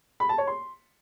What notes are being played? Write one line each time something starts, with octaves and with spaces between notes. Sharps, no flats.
B5
A5
C#5
C6